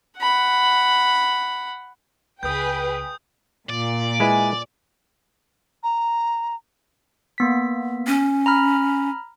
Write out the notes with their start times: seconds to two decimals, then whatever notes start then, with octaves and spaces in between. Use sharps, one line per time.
0.19 F#5 B5
2.43 C#2 G#4 B4 G5 D#6 G6
3.69 A#2 D5
4.20 G#3 E4 B4 G#5
5.83 A#5
7.38 A#3 B3 B6
8.07 C#4
8.46 A#5 B5 F6